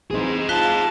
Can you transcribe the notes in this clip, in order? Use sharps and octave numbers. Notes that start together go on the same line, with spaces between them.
E3 C4 D#4 G#4 C5
F4 A5 F#6 B6 G7